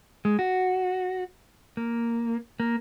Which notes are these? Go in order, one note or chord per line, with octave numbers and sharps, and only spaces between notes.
G#3
F#4
A#3
A#3